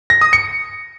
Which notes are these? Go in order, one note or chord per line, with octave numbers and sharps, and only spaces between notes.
A#6
D#6
C#7